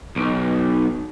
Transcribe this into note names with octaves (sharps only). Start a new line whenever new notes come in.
B1